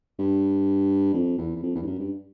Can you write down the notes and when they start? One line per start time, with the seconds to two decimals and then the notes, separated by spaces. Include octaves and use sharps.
0.19 G2
1.14 F2
1.38 E2
1.56 E2
1.63 F2
1.75 E2
1.82 G2
1.87 F#2
1.98 G2